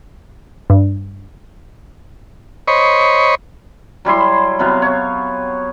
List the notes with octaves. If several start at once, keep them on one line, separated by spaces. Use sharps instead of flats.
G2
C5 C#5 D#5 B5 C#6
F#3 G3 E4 C6
C3 F#3 B3 F5
C#5